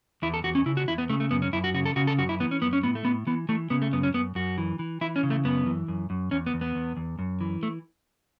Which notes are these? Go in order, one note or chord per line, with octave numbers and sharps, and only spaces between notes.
E2 E4
A4
E2 F#4
C#4
C#3 E4
F#4
E2 E4
B3
C#3 A3
A3
F#2 B3
C#4
F#2 E4
F#4
C#3 F#4
A4
C#3 F#4
A4
F#2 F#4
E4
E3 B3
C#4
F#2 B3
C#4
A2 B3
A3
A2 B3
E3 B3
E3 A3
C#3 B3
A3
F#2 B3
C#4
F#2 B3
F#2 F#4
E3
E3
E3 E4
C#4
C#3
A3
F#2 B3
E3
F#2
F#2
E2 C#4
B3
E2
B3
E2
E2
F#2
E3
A3